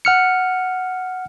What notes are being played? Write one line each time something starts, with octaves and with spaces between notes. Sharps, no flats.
F#5 F6 C#7